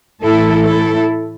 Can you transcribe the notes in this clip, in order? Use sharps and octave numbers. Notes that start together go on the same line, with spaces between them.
A2 E3 A3 E4 A4
E4 A4